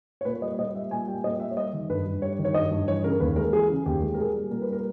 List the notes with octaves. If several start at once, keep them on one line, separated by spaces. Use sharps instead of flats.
C#5
A#2 B4
G3 D#5
A#2 D#5
G3 E5
A#2 G#5
G3 G5
A#2 D#5
G3 E5
C#5
G3 D#5
D#3
G2 B4
G2
G3 C#5
D#3
C#5
G2 D#5
G2
E3 C#5
C#3 A#4
D#2 B4
G#3 A#4
E3 G#4
C#3
D#2 G4
G#3
A#4
A#2 G#4
G3
A#2 A#4
B4
G3
A#4